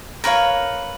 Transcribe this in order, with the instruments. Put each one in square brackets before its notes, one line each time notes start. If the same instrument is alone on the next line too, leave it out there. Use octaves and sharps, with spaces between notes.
[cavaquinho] A#4 B4 C#5 F5